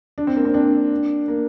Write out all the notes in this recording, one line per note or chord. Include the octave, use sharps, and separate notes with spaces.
D4
C4
A#3
C4
D4
A#3